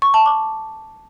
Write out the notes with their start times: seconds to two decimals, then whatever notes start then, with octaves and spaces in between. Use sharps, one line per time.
0.02 C#6
0.14 A5
0.26 D6